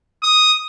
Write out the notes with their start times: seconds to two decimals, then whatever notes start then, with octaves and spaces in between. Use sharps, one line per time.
0.23 D#6